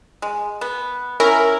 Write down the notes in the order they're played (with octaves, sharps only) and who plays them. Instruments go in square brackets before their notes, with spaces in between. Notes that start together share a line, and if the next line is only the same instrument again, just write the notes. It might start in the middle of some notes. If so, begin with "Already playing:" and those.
[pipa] G#3
B3
[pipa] C#4 E4 [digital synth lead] A#4